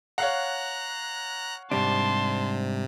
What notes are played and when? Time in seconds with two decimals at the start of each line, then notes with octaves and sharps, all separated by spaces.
0.18 C#5 F5 F#5 A#5 F#6
1.71 G#2 C3 G3 D4 A5 C6